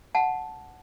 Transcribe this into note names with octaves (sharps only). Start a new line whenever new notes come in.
F#5 A5